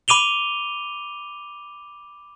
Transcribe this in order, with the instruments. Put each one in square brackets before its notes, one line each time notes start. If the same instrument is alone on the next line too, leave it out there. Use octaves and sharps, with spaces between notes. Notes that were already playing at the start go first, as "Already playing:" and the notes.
[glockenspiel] B5 D6 D#7 F7 G7